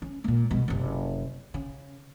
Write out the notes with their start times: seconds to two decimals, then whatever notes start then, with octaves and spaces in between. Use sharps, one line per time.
0.02 C#4
0.24 A#2 A#3
0.51 C2 B2
0.68 F#1 C3
1.54 C#3